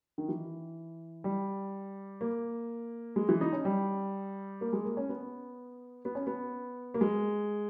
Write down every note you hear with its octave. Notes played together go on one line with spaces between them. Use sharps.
D#3
E3
G3
A#3
G#3
E3
D#4
C#4
G3
A#3
G#3
A#3
C#4
B3
B3
C#4
B3
A#3
G#3